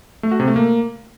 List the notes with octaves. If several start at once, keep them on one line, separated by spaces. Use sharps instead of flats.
A3
F#4
C3
A3
A#3